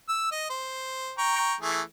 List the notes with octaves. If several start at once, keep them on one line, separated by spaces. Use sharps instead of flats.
E6
D#5
C5
G5 A#5 C#6
E3 A3 G#4